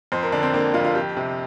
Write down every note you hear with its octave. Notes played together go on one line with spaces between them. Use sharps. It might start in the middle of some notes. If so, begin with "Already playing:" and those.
F2 C5
A#4
D3 D4
C4
D3 A#3
F2 F4
F4
F2 G4
C3